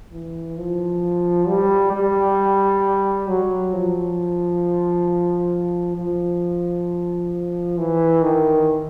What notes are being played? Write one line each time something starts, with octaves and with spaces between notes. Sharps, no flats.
E3
F3
G3
G3
F#3
F3
F3
E3
D#3